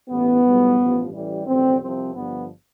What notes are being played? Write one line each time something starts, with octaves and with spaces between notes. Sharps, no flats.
A1 G2 E3 B3
B1 A2 E3 G3
A1 G2 F3
A1 A2 E3 G3
A1 G2 D3 F3 C4
C2 C3 F3 C4
G1 G2 F3 B3